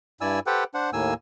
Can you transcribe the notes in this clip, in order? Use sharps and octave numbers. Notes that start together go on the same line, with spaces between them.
G2 E4 D5 G#5 E6
G4 A4 B4 C5 F#5 G5
D4 C5 F#5
D#2 A2 A#3 G#5 E6